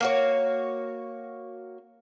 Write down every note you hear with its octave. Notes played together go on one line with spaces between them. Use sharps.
A#3 F#4 C#5